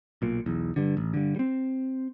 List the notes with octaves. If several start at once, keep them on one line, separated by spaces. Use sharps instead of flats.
B1 A#2
B1 E2
G2 D3
A1
G2 D3
G3 C4